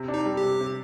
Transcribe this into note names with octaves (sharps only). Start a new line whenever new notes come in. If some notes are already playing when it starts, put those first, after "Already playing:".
Already playing: C3
D4
D#4
G3
G4
C3
C3